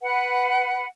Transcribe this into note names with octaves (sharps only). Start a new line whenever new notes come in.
B4 F#5